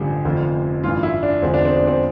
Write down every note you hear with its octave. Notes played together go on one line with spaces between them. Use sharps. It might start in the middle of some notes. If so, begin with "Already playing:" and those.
Already playing: A1 G2 D3 F3 G4
F1 F2 D3 F3
A1 G2 E3 F4
E4
D4
E1 E2 D3 F3 C4
D4
C4
D4
C4